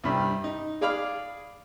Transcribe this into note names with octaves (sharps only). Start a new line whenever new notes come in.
C2 G2 G3
D#4
G#4 D5 F5 B5 D6 F6